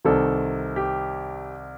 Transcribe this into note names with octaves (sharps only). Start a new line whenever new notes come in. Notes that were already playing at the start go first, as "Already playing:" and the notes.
C2 C3 D#3 A4
G4